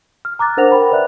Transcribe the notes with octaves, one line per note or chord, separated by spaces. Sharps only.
F6
A#5 D6 F#6 A6
D4 A#4 C5 F#5 A#6 F7
A#4 G5 B5
B4 D5 E5 F#6